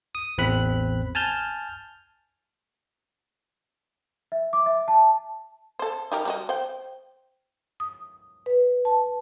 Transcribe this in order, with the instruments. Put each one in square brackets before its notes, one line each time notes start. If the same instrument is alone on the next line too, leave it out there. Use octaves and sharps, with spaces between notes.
[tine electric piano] D#6
A1 E2 C4 B5 F#6
G#5 A5 F6 G6
[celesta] E5
D6
E5
A5
[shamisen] A4 C5
D#4 G4 A#4
G3 F#4 D#5
C5 G5
[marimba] D#6
B4
A5